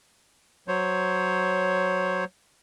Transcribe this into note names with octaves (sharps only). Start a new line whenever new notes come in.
F#3 C5 C#5